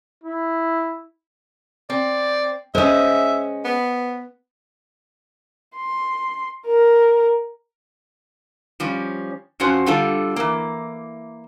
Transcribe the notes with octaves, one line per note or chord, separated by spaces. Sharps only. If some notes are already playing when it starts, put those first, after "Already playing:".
E4
C4 D5
G#3 C#4 C5 D#5 E5
B3
C6
A#4
F3 G3 C#4
F2 F3 C#4 F#4 C5
D3 G3 F4 A4
E3 A#3